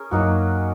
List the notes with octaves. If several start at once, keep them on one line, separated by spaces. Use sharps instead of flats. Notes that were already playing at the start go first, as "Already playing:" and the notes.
Already playing: C#4 G#4 A#4
F#2 F#3 A#3 D#4 F#4